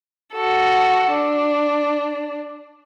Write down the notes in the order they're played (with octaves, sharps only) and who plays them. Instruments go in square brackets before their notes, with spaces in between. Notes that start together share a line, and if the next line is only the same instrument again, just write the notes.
[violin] F#4 A4
D4